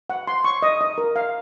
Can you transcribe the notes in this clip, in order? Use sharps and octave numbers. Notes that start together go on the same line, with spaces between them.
F#5
C6
C#6
D#5
D#5
A#4
F5